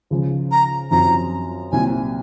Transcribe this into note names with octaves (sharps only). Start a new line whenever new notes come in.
C#2 C#3 F3
A#5
F#2 F3 C4 A#5
C2 A#2 F#3 C4 G#5